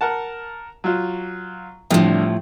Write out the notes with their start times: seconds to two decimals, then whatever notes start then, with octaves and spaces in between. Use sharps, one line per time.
0.01 A#4 F#5 A5
0.84 F#3 F4
1.90 C2 A2 D3 F3